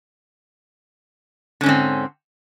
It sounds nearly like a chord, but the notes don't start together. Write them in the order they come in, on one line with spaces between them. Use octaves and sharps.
D3 C#4 G#2 C4